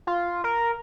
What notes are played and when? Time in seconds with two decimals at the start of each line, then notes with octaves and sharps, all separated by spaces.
0.07 F4
0.44 A#4